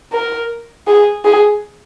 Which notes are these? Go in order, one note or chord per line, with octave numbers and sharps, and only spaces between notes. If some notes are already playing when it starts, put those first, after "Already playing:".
A#4
G#4
G#4